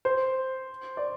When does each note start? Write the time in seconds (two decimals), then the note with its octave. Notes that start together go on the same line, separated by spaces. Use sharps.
0.05 C5
0.97 D5